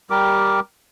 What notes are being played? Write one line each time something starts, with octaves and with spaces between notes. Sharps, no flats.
G3 G4 A#4 D6